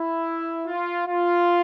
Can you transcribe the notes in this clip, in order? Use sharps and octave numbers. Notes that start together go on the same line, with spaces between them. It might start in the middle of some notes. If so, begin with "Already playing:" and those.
Already playing: E4
F4
F4